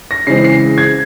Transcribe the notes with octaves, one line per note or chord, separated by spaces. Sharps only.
A#6
C#3 E3 G#3 C4 C7
C7
G#6